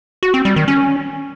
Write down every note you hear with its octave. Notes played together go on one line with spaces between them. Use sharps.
F#4
C4
G3
D#3
C#4